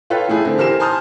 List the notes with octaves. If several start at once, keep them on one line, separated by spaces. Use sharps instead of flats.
F4 A4 B4 C#5 G5
E3 A3 E4 G#4
D3 C4
E3 G4 A#4 C5 G#5 E7
G#5 A5 C6 D#6 F6 G6